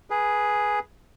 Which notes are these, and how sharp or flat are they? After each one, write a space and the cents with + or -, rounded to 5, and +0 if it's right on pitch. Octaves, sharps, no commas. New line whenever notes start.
G#4 +5 B4 -15